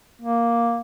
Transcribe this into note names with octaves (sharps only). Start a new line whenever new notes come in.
A#3